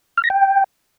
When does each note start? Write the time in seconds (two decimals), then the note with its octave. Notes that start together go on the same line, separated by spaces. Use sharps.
0.18 F6
0.24 A#6
0.30 G5